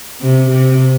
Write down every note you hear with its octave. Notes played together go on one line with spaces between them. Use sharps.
C3
C3